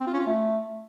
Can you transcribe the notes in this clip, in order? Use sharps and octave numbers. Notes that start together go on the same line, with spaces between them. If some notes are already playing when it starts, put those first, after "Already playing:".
C4
F4
C#4
F4
A3